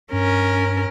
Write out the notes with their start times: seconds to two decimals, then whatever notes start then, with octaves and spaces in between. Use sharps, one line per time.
0.13 G2 C#4 A#4